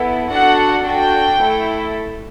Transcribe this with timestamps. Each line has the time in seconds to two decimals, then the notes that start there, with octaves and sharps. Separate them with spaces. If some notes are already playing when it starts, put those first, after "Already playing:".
Already playing: B3 E4 A4
0.31 D4 F#4 A4 F#5
0.86 D4 F#4 A4 G5
1.41 A3 E4 A4